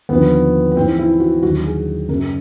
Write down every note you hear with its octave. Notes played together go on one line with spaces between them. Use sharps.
D#2 D3 F3 B3
B3
G#2 E3 C4
E4
F#4
D#2 D3 F#3 F#4
G#4
F#2 C#3 F#3 A#4